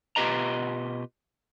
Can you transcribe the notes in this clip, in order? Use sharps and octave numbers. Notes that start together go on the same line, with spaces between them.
B2 F4 G4 B4 D#5 A#5